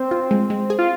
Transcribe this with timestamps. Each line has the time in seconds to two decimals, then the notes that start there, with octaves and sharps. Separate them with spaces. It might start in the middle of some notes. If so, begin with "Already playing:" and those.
Already playing: C4
0.11 F4
0.31 G#3
0.50 G#3
0.70 G#4
0.79 F4